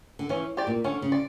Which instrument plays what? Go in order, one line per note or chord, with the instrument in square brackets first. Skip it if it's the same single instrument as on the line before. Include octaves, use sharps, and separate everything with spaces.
[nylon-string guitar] D3
[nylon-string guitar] E3 [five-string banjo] C#4
[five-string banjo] G4 D5
[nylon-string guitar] A#2
[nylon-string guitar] D3 [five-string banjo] C#4
[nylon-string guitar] C#3
[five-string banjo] D5